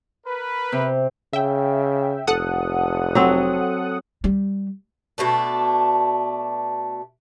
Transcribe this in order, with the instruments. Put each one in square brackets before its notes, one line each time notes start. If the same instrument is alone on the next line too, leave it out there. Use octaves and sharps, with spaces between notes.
[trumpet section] A#4 B4
[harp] C3
[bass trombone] C#3 [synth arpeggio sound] E5 G5
[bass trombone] F1 [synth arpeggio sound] A4 F#5 D#6
[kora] F#3 C4
[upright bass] G3
[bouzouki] B2 A3 D4